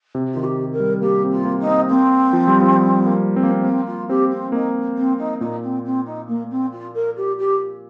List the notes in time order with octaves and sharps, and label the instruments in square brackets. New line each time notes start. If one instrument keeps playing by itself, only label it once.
[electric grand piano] C3
[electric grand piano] D#3 [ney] F4
[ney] G4
A#4
[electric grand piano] G3
[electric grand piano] A#3 [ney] G4
[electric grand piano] C4
[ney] F4
[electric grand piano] A#3
[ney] D#4
[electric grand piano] C4
[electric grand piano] A#3 [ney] C4
[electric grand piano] F3
G3
F3
G3
A#3
C4
A#3
C4
[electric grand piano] A#3 [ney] C4
[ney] F4
[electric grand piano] C4 [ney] G4
[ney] C4
[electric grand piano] A#3 [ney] D#4
[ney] C4
D#4
[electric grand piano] A#2 [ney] D#4
[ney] C4
C4
D#4
A#3
C4
F4
A#4
G4
G4